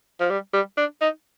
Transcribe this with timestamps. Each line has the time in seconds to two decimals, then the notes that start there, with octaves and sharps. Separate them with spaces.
0.20 F3
0.30 G3
0.53 G3
0.77 D4
1.01 D#4